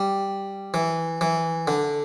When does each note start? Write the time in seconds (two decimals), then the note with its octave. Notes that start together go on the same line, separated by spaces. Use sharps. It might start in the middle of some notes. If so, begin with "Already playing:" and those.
Already playing: G3
0.74 E3
1.21 E3
1.68 D3